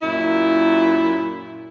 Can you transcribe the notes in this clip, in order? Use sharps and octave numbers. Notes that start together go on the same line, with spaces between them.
F#2 A#2 E4